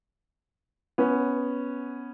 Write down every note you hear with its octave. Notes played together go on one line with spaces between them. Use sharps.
B3 C#4